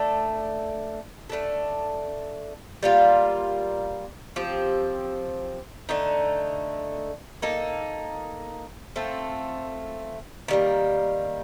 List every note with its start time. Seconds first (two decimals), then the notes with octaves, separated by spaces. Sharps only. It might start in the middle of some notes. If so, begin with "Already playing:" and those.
Already playing: A3 D4 A4
1.30 A3 D4 A4
2.83 G3 A#3 F4
4.36 F3 C4 G4
5.89 D3 A3 D#4
7.42 A#3 D#4 A4
8.96 A3 C4 F4 A4
10.48 D#3 G3 A#3